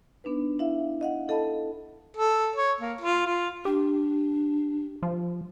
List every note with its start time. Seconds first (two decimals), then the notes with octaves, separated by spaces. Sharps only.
0.24 B3 D4 D#4 B4
0.59 E4 E5 F5
1.01 D#5 F5 F#5
1.28 E4 A4 D#5 F5 A5 B5
2.17 A4
2.56 C#5
2.81 A#3
3.01 F4
3.26 F4
3.65 D4 G4
5.03 F3